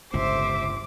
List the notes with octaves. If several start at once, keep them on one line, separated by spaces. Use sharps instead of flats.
G1 C#2 A2 C5 E5 D6